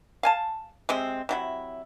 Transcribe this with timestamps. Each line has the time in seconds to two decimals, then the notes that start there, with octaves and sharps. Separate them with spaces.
0.23 F5 G#5 A5
0.89 C3 G#3 C4
1.29 C3 F#3 E4